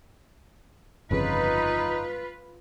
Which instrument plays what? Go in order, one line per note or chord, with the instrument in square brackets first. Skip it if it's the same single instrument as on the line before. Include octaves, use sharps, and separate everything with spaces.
[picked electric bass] G1 F2 C#3 [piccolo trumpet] D#4 [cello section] F4 B4